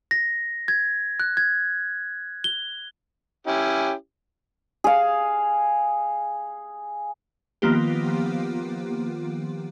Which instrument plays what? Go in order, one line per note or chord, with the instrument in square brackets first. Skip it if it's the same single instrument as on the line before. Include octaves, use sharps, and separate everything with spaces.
[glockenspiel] A#6
G#6
F#6
G#6
G7
[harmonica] C#4 E4 G4
[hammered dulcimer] G#4 F5
[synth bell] D#3 F3 A#3 B3 F4 G4